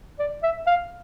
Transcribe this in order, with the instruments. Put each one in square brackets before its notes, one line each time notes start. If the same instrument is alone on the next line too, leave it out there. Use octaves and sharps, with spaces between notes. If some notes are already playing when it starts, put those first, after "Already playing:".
[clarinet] D5
E5
F5